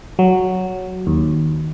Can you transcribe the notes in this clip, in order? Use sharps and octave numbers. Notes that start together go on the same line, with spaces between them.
F#3
D#2